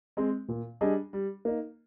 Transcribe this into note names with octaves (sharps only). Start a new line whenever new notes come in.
G#3 C4
A#2
G3 D4 G#4 D#5
G3
A#3 D#4